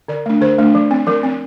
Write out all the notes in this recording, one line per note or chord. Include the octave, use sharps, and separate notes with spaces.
D3 D5
A3 D4
D3 C5
A3 D4
F3
C4
F3 A#4
C4